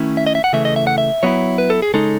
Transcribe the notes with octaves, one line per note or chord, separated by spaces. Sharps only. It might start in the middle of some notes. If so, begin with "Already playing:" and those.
Already playing: D#3 A3 C#4 E4
E5
D#5
E5
F#5
C#3 E3 A3 E5
D#5
E5
F#5
E5
F#3 B3 E4 C#5
B4
A4
G#4
C#3 G#3 D#4 A4